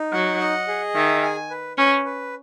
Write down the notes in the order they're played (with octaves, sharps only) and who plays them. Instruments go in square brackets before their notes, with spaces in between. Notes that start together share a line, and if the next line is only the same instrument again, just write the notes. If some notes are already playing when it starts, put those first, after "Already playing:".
Already playing: [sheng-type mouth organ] D#4
[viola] F#3 [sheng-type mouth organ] F#5
[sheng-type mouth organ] D#5
G#4
[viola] D#3 [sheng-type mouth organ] E5
[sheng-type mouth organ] G#5
B4
[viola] C#4 [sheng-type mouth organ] B4
[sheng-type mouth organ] B4